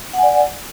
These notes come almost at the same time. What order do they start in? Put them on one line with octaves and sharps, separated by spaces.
F#5 G#5 D5